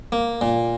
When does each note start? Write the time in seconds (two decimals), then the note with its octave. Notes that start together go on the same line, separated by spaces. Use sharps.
0.12 A#3
0.41 A#2